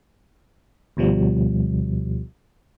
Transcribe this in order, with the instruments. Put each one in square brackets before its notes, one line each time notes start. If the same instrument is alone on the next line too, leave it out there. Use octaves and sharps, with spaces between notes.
[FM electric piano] D2 B2 F3 G3